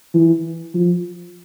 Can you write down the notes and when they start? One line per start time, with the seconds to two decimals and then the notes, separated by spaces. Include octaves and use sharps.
0.14 E3
0.74 F3